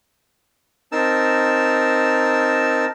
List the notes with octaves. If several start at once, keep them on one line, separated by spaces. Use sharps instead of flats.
C4 D#4 A#4 A5 E6